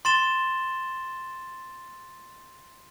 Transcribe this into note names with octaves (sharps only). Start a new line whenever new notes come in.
C6 A6 E7 G7